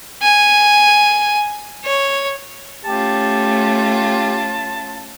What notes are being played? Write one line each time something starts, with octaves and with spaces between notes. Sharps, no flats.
G#5
C#5
A3 C#4 F4 G4 A5